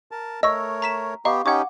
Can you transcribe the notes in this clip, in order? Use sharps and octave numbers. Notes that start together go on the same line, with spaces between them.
A#4 A5
A3 A#4 C#5 D#5 C#6 E6 A#6
A#5 B6 E7
B3 G4 D#5 F5 A#5 C#6
C#4 D#4 G4 F#5 C#6 D6 G#6